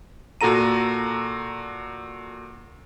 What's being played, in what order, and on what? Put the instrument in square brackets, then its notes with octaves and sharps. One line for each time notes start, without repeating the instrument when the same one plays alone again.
[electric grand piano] A#2 F#4 A4 A#5 D#7